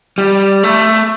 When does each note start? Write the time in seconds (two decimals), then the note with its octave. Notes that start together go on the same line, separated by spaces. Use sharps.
0.18 G3
0.63 A3